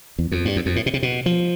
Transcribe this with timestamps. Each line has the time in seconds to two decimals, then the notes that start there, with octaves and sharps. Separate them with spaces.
0.19 E2
0.32 F2
0.45 G2
0.56 E2
0.66 F2
0.76 A2
0.86 B2
0.94 C3
1.03 B2
1.26 F3